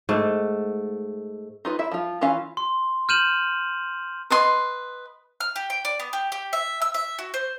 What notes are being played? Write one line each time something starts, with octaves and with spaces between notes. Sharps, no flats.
G#2 A3
D#4 F4 B4
E4 E5
F3 F4
E3 C#4 F4 F5
C6
F6 G6 D#7 E7 F#7
B4 D#5 C6
F6
G4
G5
D5
B3
G4
G4
E5
E6
E5
F#4
C5